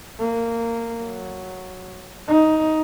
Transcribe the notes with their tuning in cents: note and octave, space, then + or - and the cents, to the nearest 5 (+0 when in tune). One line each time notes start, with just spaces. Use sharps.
A#3 -15
F#3 +0
D#4 +10